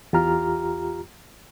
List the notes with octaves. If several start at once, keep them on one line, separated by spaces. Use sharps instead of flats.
E2 F4 G4 A#5 F6